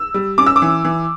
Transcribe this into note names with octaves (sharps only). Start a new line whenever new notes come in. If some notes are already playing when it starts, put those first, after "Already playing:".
Already playing: E6
G3
C#4 D6
E6
D6
E3
E3